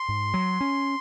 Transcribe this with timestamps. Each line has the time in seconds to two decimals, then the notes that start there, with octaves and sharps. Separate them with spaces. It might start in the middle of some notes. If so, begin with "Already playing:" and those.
Already playing: C6
0.08 G#2
0.34 F#3
0.60 C#4